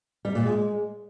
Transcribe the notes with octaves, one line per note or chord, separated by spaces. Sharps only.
G3
A#2
G#3